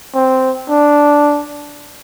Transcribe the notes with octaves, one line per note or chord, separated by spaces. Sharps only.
C4
D4